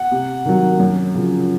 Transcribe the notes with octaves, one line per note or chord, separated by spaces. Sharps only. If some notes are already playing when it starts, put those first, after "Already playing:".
Already playing: F#5
C3
D#3 F#3
F#2
C#3 F3